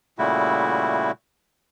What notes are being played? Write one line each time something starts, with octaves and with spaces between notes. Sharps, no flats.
A#2 C#3 G3 A3 E4 F#4